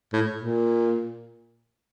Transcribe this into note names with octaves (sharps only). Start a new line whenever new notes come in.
A2
A#2